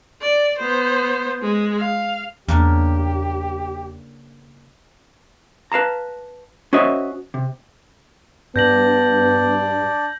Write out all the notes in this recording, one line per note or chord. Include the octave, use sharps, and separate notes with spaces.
D5
B3 C5
G#3
F5
E2 C#3 A#3 D4 G4
B4 F5 A5 A#5
C#4 F#4 C5 D#5 E5
C3
G2 B3 D4 D5 G6 A#6 F#7